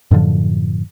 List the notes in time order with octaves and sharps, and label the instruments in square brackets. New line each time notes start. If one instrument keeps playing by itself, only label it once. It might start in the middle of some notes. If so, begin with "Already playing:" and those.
[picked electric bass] F#2 A2 D3 F3